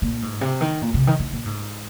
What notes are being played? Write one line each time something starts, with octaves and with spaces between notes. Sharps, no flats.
A#2
G#2
C3
D#3
A#2
C3
D#3
D#3
A#2
G#2